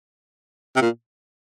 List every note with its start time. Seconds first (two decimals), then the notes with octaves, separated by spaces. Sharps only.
0.76 C3
0.82 A#2